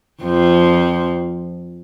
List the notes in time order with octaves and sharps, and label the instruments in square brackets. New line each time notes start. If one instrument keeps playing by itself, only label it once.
[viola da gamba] F2 F3